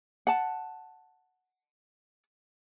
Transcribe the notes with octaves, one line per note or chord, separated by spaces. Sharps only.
F#5 A5